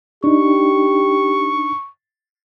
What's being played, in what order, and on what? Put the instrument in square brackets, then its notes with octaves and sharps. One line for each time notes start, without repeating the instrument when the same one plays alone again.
[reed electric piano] D4 D#4 [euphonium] G4 [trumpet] C#6